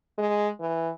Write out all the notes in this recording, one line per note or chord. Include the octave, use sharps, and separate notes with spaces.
G#3
E3